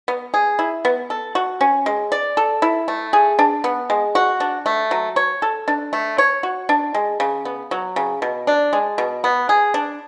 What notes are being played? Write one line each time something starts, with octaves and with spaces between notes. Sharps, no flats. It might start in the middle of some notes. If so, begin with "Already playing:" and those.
B3
G#4
E4
B3
A4
F#4
C#4
G#3
D5
A4
E4
A3
G#4
D4
B3
G#3
F#4
D4
A3
F#3
C#5
A4
D4
A3
C#5
F#4
D4
G#3
C#3
B3
F#3
C#3
B2
D4
G#3
B2
B3
G#4
D4